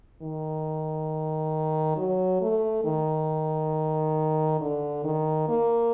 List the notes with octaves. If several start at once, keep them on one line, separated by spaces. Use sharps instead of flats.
D#3
F#3
A3
D#3
D3
D#3
A#3